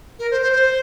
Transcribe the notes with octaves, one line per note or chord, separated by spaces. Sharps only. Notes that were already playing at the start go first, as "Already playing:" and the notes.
A#4
C5
C5
C5